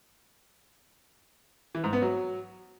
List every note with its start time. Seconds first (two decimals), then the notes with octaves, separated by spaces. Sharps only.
1.75 E3
1.84 G#2
1.93 B3
2.02 F#3